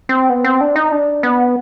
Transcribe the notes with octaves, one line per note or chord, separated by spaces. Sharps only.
C4
B3
C4
D4
D#4
D4
B3